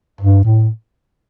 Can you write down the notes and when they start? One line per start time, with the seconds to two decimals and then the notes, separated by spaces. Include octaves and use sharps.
0.21 G2
0.45 A2